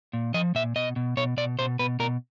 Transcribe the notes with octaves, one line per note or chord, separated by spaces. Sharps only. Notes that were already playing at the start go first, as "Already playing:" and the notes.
A#2
F3 D#5
A#2 E5
B2 D#5
B2
B2 C#5
B2 D5
B2 C5
B2 B4
B2 A#4